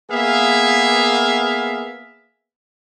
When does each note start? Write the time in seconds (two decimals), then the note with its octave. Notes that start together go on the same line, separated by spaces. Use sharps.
0.11 A#3 B3 G#4 E5 F5